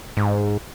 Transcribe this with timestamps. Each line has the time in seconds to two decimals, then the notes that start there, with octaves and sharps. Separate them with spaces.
0.17 G#2